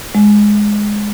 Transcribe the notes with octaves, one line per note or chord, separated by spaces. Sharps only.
G#3